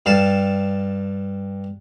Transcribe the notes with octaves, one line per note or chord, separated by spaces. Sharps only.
G2 F5 A5